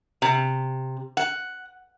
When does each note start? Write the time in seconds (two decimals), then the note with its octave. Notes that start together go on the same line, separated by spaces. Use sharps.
0.22 C3
1.17 F#5